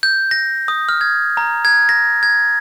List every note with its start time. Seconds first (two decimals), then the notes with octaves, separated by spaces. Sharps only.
0.03 G6
0.31 A#6
0.68 D#6
0.89 F6
1.01 G#6
1.37 A#5
1.65 G#6
1.89 A#6
2.23 G#6